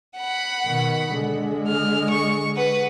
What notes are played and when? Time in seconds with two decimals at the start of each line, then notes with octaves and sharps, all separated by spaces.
0.17 F#5 B5
0.66 B2 D#3
1.13 D3 G#3
1.68 F6
2.10 C#6
2.56 B4 F#5